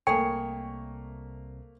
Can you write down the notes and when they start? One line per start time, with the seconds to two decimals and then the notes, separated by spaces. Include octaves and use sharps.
0.07 C2 A3 A#3 G#4 C#5 G5